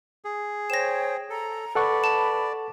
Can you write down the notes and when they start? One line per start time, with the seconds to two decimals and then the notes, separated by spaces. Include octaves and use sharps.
0.25 G#4
0.70 C5 C#5 G5 A#6 E7
1.30 A4 A#5
1.75 A4 B4 D5 F#5 C#6
2.04 A5